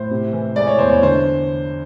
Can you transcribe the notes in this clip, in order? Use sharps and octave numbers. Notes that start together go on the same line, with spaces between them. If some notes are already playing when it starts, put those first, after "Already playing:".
Already playing: A2 C5
C3
E3
G#3 D5
C#5
E2 C5
C#5
D3 C5